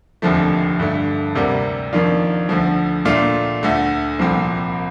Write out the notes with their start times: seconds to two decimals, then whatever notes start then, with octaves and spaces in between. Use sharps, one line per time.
0.22 F1 D#2 D3 F3 A3
0.80 G2 D3 A3
1.35 D2 C3 G3 A#3
1.93 F2 D#3 A#3 D4 F4
2.49 D2 D3 F3
3.05 A#2 A3 D4 F4
3.63 D2 D3 A3
4.19 C2 A#2 F3 C4